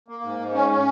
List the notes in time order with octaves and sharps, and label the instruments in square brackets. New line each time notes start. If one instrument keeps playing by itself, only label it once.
[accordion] A#3
G#2
G#2
C#4
C#4